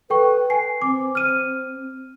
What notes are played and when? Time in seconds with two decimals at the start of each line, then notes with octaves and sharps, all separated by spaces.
0.10 A4 B4 G5 C#6
0.50 G#5 C7
0.82 C4 D6
1.15 F6 D#7